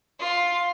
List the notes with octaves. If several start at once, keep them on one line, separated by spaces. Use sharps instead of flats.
F4